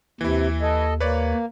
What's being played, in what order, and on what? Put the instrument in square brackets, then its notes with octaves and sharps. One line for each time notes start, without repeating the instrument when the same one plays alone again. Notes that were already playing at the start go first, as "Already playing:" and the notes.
[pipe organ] D#2 [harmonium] C3 [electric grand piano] E3 E4
[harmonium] A4 D#5
[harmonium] A#3 [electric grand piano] B4 C#5 D5